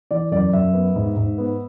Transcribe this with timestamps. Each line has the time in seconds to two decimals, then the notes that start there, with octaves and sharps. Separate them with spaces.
0.11 E3 D5
0.31 F#2 D5
0.53 F#2 E5
0.74 B3
0.96 G#2
1.17 G#2
1.38 B3